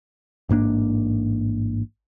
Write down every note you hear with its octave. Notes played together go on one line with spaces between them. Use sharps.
A1 G#2 A#3 D4